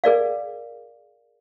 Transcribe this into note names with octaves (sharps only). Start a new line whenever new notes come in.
G#4 A#4 D5 F5